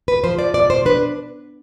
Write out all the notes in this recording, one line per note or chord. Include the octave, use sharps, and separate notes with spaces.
B4
F3 C5
D5
B2 D5
C5
D4 B4